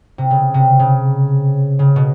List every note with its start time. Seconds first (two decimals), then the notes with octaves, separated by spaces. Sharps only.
0.18 C3
0.31 C#3
0.54 C3
0.79 C#3
1.79 C#3
1.96 B2